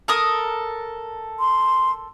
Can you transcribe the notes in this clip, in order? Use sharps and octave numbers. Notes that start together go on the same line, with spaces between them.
A4 A#4 D#6
C6